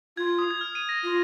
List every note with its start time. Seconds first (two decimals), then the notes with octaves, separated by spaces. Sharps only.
0.17 F4 G#6
0.38 D#6
0.51 G#6
0.61 F6
0.75 D#7
0.89 A#6
1.04 F4